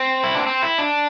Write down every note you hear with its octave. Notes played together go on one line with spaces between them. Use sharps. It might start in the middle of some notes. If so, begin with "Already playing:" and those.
Already playing: C4
E4
D4
C4
E4
D4